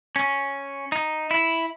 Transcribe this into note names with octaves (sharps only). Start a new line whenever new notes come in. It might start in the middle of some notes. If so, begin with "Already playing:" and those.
C#4
D#4
E4